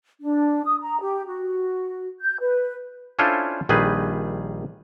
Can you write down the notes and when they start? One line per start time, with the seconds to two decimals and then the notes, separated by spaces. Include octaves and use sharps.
0.21 D4
0.65 D#6
0.81 A#5
1.01 G4
1.27 F#4
2.20 G6
2.41 B4
3.19 C#4 D4 E4 F4 A4 C5
3.69 A#1 D#3 G3 G#4 B4